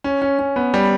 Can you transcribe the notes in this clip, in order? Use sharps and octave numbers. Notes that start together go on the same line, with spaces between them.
C#4
C#4
C#4
B3
G3